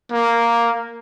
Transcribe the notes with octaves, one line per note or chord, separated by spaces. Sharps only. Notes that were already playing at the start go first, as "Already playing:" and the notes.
A#3